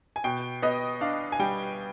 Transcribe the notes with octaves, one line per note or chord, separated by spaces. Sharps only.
G#5
B2 G5
B3 D#5
D4 F5
G#5
G3 G5